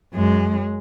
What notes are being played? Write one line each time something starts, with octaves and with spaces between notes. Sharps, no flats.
F#2 G#3